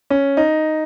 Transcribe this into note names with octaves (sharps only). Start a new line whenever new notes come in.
C#4
D#4